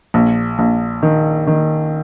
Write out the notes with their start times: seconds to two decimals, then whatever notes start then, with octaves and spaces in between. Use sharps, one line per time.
0.14 A#1
0.59 A#1
1.03 D#3
1.47 D#3